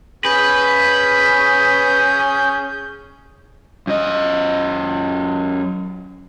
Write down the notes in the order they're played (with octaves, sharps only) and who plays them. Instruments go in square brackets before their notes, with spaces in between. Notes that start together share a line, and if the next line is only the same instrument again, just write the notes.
[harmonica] C#4 G#4 [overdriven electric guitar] B4 [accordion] G6
[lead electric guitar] F#2 D#5